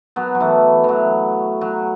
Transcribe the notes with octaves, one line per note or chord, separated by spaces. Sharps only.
F#3 B3
F#3
E3 A3
E3 F#3
F#3